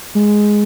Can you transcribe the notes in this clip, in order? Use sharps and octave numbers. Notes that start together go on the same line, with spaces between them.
G#3